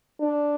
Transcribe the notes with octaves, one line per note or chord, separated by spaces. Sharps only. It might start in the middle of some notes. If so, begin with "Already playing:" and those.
D4